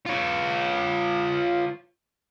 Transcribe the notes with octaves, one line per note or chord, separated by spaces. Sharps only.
F4 C#5